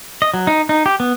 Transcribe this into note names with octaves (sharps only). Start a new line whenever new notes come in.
D#5
F#3
D#4
D#4
G4
B3